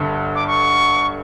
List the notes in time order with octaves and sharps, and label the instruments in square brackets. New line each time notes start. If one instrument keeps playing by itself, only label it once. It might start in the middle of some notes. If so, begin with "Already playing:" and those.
Already playing: [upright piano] G1 G2 D3
[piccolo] D6
C#6